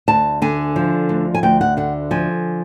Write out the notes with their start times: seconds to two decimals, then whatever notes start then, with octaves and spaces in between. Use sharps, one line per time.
0.08 D2 A5
0.42 D3 G#5
0.76 F3
1.09 D2
1.34 G#5
1.43 D2 G5
1.61 F#5
1.77 D3 F#5
2.11 F3 G#5